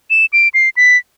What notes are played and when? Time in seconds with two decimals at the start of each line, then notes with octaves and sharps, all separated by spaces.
0.10 E7
0.33 D7
0.54 C7
0.77 B6